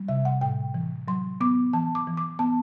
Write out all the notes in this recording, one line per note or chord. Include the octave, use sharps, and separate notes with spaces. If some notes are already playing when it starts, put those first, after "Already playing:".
Already playing: G3
C3 E5
F#5
A2 G5
E3
F#3 C6
B3 D6
E3 A5
D6
E3
D6
B3 A5